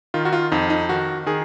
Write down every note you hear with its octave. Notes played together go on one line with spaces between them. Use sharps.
D#3 F4
F#4
F4
F2 D#4
D#4
D#3 F#4
D#3 G#4